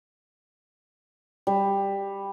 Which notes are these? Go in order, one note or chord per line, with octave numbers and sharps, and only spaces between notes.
G3